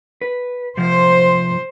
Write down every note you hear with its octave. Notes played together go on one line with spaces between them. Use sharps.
B4
C3 F3 C5